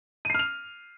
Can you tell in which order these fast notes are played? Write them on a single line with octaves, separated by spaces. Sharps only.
D#7 C7 F6 F7